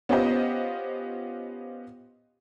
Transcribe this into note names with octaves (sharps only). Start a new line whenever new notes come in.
B3 C#4 F4 G4 C5 D#5